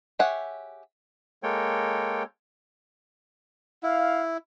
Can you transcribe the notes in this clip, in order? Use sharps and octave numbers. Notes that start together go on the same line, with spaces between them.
G4 G#4 C#5 E5 F#5
G#3 A#3 A4 C#5 G5
E4 F5